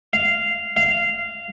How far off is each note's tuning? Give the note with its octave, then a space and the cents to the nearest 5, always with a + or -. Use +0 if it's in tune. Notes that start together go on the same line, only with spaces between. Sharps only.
F5 -10
F5 -15